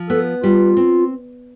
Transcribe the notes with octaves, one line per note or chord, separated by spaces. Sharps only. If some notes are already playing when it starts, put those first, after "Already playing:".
Already playing: F3
B3 A4
G3 F4
C4